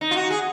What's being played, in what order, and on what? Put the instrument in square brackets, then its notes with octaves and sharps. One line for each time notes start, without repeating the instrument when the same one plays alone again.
[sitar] D#4
F4
F#4
G#4